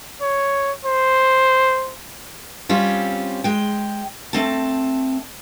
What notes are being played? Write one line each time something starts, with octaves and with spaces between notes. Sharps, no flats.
C#5
C5
G3 C4 C#4 F4
G#3 G5
A3 C4 A5